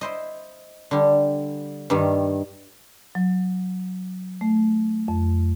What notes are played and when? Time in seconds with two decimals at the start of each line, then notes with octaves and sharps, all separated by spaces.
0.01 E4 C5 D#5
0.91 D3 G3
1.90 G2 D#3 G3
3.15 F#3
4.41 A3
5.08 F2